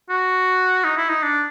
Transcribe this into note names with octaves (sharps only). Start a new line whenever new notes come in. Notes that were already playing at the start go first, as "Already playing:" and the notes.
F#4
D#4
E4
D#4
D4